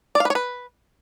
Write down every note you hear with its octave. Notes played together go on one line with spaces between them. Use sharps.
D5
F5
B4
C#5
B4